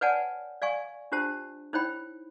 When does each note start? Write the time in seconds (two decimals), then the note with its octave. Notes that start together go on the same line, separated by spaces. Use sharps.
0.01 B4 C#5 D5 F#5 G#5 A5
0.62 D5 F5 G#5 C#6
1.12 D4 F4 G4 C5 A5
1.73 D#4 E4 C5 C#5 G5 B5